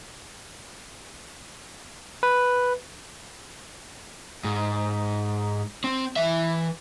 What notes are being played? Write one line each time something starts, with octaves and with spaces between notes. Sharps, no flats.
B4
G#2
C4
E3 E5